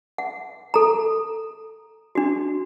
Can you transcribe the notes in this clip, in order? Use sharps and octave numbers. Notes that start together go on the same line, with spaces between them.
F#5
A4 A#5
D4 F#4